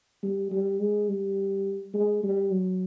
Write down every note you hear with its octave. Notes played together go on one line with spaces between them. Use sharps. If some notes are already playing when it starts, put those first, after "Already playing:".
G3
G3
G#3
G3
G#3
G3
F#3